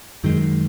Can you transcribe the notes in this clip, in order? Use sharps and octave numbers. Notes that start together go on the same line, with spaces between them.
F#2 D#3 G#3